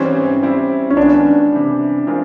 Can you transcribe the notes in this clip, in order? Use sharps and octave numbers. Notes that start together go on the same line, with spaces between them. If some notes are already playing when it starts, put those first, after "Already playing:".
Already playing: G#2 E3 G3 C4 C#4
G3 C4 E4
C#4
D#3 G#3 B3 D4
C3 E3 G3
E3 G#3 C4 F4 A#4